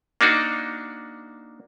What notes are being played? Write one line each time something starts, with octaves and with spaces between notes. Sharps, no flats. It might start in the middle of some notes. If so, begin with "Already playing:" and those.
A#3 D4 D#4 F#4